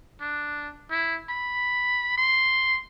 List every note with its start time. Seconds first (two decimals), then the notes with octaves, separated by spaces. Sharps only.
0.21 D4
0.90 E4
1.29 B5
2.18 C6